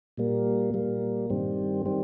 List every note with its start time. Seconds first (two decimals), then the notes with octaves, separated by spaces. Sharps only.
0.18 A#2 G3 A#3
0.74 A#2 G3 A#3
1.30 G2 D#3 G3 C4
1.86 D#3 G3 C4